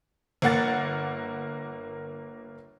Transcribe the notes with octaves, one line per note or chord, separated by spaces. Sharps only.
G1 A#3 F#5 A6